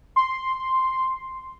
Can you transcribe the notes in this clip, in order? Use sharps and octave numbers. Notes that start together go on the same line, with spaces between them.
C6